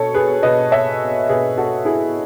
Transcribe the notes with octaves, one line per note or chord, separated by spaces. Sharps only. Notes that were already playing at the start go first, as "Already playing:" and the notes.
Already playing: B2 A4 C#5
G#4 B4
B2 B4 D#5
C#5 E5
B2 G#4 B4
F#4 A4
E4 G#4